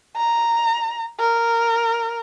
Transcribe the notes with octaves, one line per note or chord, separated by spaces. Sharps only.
A#5
A#4